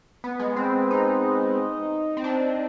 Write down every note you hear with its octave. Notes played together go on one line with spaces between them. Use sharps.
B3
G#3
C4
D#4
C4
D4